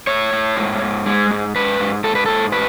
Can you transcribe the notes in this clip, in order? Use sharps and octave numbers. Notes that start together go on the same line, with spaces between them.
A2 C#5
A2
G#2
G#2
G#3
G#2
G#2 B4
G#2
G#2 A4
B4
G#2 A4
A2 B4